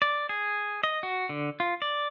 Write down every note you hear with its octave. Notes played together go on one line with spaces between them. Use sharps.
D5
G#4
D#5
F#4
D3
F4
D5